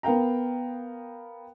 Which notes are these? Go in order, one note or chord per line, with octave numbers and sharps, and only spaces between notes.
B3 A#4 F5 G5 A#5